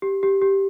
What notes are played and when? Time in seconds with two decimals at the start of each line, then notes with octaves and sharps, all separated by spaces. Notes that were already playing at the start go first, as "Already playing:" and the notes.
0.02 G4
0.23 G4
0.42 G4